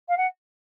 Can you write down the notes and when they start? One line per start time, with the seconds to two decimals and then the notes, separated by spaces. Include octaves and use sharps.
0.09 F5
0.17 F#5